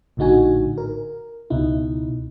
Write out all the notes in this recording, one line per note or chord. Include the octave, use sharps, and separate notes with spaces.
A#1 A2 D3 D#4 F#4 G#5
A#4
C#2 B2 D#4 E4